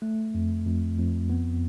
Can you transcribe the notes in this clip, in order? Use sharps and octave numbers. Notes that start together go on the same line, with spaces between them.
A3
F2
F2
F2
B3